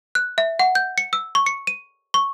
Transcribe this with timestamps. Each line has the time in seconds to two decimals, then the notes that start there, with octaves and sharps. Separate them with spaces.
0.15 F#6
0.38 E5
0.59 F#5
0.75 G6
0.98 C#7
1.13 E6
1.35 C#6
1.46 C#7
1.67 D#7
2.14 C#6